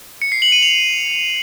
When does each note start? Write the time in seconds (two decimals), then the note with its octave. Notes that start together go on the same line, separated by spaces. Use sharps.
0.22 C#7
0.32 C7
0.42 F#7
0.52 D#7
0.62 F7